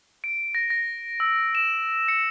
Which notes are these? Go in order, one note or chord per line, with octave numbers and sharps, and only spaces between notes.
D7
A#6
A#6
E6
E7
C#7